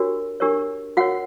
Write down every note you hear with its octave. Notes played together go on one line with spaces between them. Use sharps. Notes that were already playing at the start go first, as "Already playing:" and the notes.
Already playing: D4 F#4 G4 A#4 C#5
D4 G4 A#4 C#5
F#4 A#4 C#5 F#5